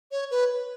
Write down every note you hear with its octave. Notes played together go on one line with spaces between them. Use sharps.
C#5
B4